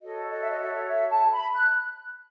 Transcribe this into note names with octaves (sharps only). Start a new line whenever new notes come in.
F#4 A4 C#5 D#5
D#5
E5
D#5
E5
E5
A5
B5
F#6